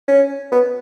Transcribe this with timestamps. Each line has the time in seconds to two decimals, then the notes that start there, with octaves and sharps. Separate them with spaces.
0.08 C#4
0.52 B3